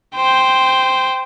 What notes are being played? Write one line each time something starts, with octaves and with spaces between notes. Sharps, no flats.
C5 G5